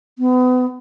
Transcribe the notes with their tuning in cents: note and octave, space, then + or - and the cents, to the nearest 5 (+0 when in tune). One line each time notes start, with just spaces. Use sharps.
B3 +35